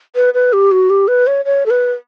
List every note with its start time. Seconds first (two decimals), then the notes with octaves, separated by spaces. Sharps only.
0.16 B4
0.34 B4
0.53 G4
0.72 F#4
0.90 G4
1.08 B4
1.27 C#5
1.45 C#5
1.66 A4
1.70 B4